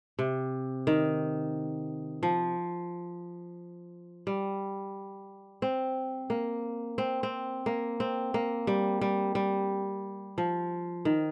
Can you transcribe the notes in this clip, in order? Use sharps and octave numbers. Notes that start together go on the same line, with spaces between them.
C3
D#3
F3
G3
C4
A#3
C4
C4
A#3
C4
A#3
G3
G3
G3
F3
D#3